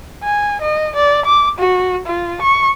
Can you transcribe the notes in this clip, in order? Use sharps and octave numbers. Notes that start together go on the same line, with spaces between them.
G#5
D#5
D5
D6
F#4
F4
C#6